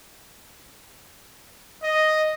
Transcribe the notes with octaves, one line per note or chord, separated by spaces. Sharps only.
D#5